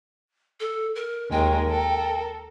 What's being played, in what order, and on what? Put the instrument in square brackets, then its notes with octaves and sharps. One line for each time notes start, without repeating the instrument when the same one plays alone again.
[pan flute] A4
A#4
[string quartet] D#2 G#3 A#4 [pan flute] G5
[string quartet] A4 A#4